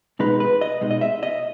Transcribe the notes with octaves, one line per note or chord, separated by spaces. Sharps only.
B2 G#3 D#4 B4
B4
D#5
B2 G#3 D#4
D#5
E5
D#5